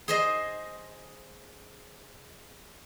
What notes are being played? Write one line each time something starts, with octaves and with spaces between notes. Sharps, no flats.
G#4 C5 D#5